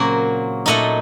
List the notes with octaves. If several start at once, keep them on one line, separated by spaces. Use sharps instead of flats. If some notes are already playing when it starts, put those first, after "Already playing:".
Already playing: A#2 C#3 F#3 A#3 C4 F#4 A#4 C5
A#2 A3 D#4 D#5 F#5